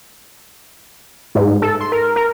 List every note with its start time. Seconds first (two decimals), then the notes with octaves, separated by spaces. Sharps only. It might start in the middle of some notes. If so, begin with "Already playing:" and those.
1.35 G#2
1.62 A4
1.81 C6
1.92 A#4
2.16 A#4